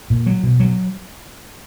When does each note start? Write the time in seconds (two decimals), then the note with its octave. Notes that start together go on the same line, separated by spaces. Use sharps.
0.10 A#2
0.26 F#3
0.43 B2
0.60 F#3